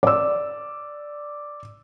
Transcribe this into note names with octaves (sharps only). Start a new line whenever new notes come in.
D5 E6